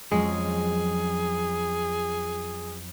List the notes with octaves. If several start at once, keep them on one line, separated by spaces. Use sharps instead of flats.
F2 F#3 G#3 C#4 G#4